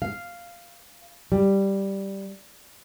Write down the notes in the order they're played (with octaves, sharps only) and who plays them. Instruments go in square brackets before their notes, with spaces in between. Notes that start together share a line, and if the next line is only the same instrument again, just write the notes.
[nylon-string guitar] F5
G3